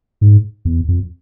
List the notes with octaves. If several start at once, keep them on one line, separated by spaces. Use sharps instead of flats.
G#2
E2
F2